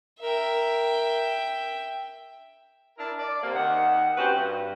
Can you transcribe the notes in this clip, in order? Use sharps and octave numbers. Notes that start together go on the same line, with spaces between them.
A#4 E5 G5
D4 E4 A#4
D5
C3 A#3
D#2 D#3 F#5
C4 C#4 F#4 G4 B4
G2